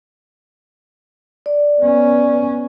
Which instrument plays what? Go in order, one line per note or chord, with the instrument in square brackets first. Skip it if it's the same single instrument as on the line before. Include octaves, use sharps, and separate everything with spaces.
[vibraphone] D5
[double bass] B3 C#4